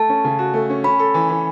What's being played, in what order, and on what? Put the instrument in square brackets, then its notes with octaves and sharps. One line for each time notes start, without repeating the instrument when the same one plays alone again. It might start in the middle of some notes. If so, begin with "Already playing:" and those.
Already playing: [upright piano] A3 [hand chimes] A5
[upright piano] C#4
C#3
F#4
A3
C#4
[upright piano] C#4 [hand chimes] B5
[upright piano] A4
E3
E3